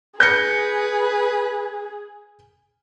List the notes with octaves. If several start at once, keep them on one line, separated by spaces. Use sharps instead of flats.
G#4 B4 G6 A#6 C#7